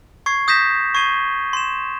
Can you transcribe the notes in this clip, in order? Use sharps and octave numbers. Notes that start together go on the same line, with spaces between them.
C#6 G#6 C7
D#6 G6 A#6 B6 E7
C#6 G#6 C7 D#7 G7
C6 E7